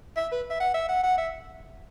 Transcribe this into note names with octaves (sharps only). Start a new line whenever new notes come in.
E5
B4
E5
F#5
E5
F#5
F#5
E5